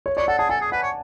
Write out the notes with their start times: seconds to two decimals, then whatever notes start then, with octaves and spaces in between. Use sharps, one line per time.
0.06 C#5
0.17 C#5 D5
0.27 A4 F#5
0.38 G#4 A5
0.49 A4 G#5
0.61 G#4
0.72 B4 F#5
0.83 C#5